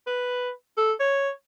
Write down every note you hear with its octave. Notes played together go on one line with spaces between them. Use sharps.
B4
A4
C#5